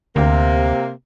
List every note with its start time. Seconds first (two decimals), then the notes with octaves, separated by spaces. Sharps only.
0.16 D2 C3 A#3